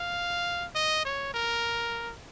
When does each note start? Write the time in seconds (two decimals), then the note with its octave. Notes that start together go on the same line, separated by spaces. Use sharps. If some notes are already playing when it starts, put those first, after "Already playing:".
Already playing: F5
0.75 D#5
1.05 C#5
1.34 A#4